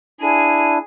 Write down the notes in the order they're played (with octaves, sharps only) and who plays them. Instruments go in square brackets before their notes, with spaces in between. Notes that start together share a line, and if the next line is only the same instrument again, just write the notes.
[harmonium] D4 E4 [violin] G#4 D#7